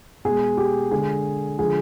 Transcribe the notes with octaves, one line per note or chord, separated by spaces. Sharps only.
B2 G#3 G#4
G4
D3 G#3 G#4
D3 F3 G#3 G#4